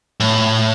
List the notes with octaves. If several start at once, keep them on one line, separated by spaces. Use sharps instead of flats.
A2